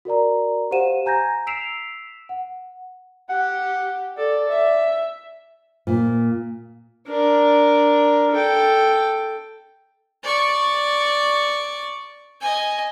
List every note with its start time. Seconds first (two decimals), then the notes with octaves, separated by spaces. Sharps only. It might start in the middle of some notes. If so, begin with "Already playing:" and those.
0.05 F#4 A#4 D5 A#5
0.71 G4 C5 F5 F#5 D#7 E7
1.06 G#5 A#5 G6 G#6 A#6
1.47 E6 B6 C7 D7 E7 F7
2.29 F#5
3.29 G4 F#5
4.17 A4 D5
4.49 E5
5.87 A#2
7.07 D4 A#4
8.32 A4 G5
10.23 D5 C#6
12.41 D#5 G#5